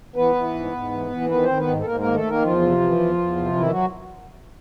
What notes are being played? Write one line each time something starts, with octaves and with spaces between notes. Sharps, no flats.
E3 B3 B4
E3
G#2
G#2
E3
E3
D#3 B3 B4
D#3 C4 C5
B3 B4
G#2
A4
G#2 A#3 A#4
A#3 A#4
D#3
A3 A4
D#3 A#3 A#4
E2 F3 F4
C3
E3
E2
E2
C3
D#3 E3 E4
F#3 F#4